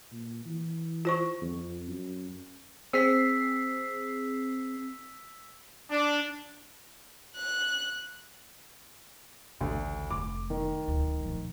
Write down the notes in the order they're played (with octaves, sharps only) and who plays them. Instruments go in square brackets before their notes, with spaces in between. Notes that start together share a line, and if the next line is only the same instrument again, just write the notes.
[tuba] A#2
E3
[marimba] F4 C5 C#6
[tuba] F2
F#2
[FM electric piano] C4 G#4 C7 [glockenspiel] E6 B6
[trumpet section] D4
[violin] F#6
[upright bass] A1 C#3 [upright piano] D2
[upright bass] F1 [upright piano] D6
[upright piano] D#3
[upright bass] D1 D2
A#2 F3